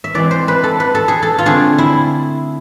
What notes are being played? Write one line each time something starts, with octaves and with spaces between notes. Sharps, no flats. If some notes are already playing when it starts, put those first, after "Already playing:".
E5
E3 G#3 C4 D5
C5
B4
A4
B4
A4
G#4
A4
F4
D3 A3 C4 G#4
E4